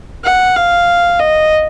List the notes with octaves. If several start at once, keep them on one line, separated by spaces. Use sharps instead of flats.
F#5
F5
D#5